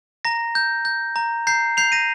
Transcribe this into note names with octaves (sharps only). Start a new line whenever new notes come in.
A#5 A#6
G6
G6
A#5
A#5 G6 C7
G6 C7 F7
A#6 D#7